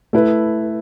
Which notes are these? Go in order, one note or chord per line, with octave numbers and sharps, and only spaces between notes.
A3 E4 B4